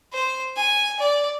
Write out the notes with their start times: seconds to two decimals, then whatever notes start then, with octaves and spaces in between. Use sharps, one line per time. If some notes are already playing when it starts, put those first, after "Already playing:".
0.13 C5
0.56 G#5
0.99 D5